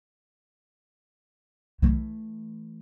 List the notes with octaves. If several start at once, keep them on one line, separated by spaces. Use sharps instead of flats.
E3 A3